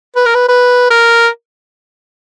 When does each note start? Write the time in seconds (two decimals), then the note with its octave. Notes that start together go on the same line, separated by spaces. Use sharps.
0.16 B4
0.26 A#4
0.35 B4
0.48 B4
0.90 A#4